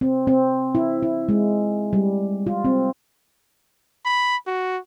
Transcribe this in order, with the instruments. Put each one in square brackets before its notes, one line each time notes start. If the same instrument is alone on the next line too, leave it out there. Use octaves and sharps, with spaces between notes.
[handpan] C4
C4
E4
E4
G#3
G3
F4
C4
[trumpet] B5
F#4